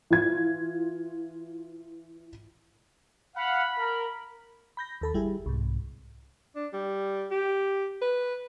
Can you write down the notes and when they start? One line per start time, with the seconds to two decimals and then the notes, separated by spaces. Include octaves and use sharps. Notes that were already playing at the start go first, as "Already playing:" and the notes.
0.10 E3 F4 G#6
3.36 F5 F#5 B5
3.78 A#4
4.77 B5 G6 A#6
5.01 D#2 A4 B5
5.14 G1 G3 E4 G#4
5.46 C2 G#2
6.56 D4
6.73 G3
7.31 G4
8.02 B4